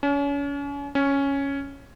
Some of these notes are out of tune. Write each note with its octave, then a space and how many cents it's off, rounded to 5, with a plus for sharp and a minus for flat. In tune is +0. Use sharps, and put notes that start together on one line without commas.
C#4 +35
C#4 +0